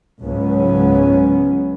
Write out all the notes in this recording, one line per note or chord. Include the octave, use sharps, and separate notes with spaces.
C#2 G#2 F#3 B3 C#4